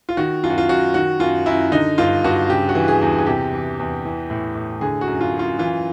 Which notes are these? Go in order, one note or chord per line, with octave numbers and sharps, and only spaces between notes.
F4
D#3 F#4
F#2 F4
F#4
F4
F#2 F#4
D#3 F#4
F#2 F4
F#2 E4
D3 D#4
G2 F4
G2 F#4
C#3 G4
F#4
E3
G#4
E2
G#4
C3 G4
E3
E2
E3
A2
A2
D3 G#4
F#4
F#2
F4
F#2
F4
E3 F4